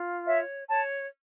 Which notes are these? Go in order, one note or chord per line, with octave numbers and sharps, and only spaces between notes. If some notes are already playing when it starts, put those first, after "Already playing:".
Already playing: F4
C#5 E5
C#5 A5